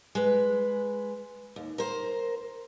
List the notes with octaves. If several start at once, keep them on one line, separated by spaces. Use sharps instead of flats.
G#3 B4
D#2
A#4 C5